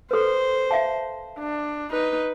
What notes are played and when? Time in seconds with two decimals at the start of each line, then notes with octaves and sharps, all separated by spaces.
0.11 A4 B4 C5
0.71 E5 F5 A5
1.38 D4
1.91 D#4 B4